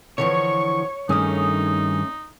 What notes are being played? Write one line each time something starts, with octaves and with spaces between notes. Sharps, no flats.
D3 E3 F3 C#5 C#6
G2 D#3 A3 C#4 D#4 G#4